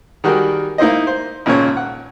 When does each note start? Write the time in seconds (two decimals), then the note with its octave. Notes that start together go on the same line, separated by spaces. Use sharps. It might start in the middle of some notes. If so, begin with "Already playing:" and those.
0.24 D#3 G3 F#4 G#4 A#4
0.78 A#3 D#4 E4 C5 D#5
1.07 C5
1.46 G#1 A#2 C#3 C#5
1.77 F#5